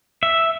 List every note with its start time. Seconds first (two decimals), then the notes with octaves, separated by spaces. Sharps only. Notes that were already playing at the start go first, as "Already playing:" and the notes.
0.23 E5